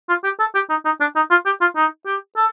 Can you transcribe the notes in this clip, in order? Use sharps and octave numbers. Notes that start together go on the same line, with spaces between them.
F4
G4
A4
G4
D#4
D#4
D4
D#4
F4
G4
F4
D#4
G4
A4